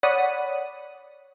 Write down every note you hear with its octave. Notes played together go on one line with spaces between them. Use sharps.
C#5 D5 F#5 B5 D#6